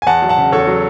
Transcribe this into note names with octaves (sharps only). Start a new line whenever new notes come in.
G#5
E2 F#5 A5
F#3
F#5 A5
C#3
E2 A4 C#5
F#3